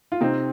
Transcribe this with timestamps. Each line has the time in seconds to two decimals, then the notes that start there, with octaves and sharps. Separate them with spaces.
0.12 F4
0.21 C3 C4 D#4